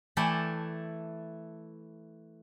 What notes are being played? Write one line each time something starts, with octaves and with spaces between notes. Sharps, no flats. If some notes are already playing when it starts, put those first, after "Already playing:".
E3 A3 E4 D5 G5 A5